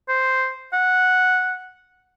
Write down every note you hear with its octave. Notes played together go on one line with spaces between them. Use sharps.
C5
F#5